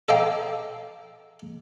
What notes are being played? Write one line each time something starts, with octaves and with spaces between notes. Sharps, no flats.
A4 D5 D#5 F5 G5 A#5